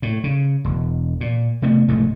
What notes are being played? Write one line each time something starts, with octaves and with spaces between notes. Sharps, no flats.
A2
C#3
E1
A#2
C3 A3 B3
F1 G#2 B2 A3